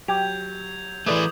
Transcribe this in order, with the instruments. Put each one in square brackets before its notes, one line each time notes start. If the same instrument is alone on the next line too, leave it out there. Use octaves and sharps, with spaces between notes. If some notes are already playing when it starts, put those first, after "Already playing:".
[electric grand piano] F#3 [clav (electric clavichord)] G4 [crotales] G6 G#6 F7
[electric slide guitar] E3 A3 [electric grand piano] G#4 B4 D5 [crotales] D6 D#6 F#7